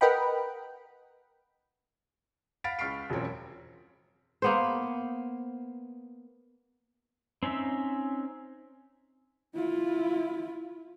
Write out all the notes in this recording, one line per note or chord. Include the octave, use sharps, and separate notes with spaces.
A#4 B4 D#5 F#5 G5 B5
F5 F#5 B5 A6 B6 D7
C#2 C#6 F6 B6 C7 D7
E1 F#2 F3 C4 C#5
A#3 B3 C5
C4 C#4 D#4 E5
E4 F4